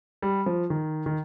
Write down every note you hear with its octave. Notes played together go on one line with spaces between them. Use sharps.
G3
F3
D#3
D#3